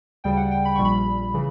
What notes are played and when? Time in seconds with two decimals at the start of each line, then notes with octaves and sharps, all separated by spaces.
0.24 D2 C#3 G3 G5
0.37 F#5
0.51 G5
0.65 B5
0.75 A#1 A#2 G3 C#6
0.85 B5
1.34 C#3 E3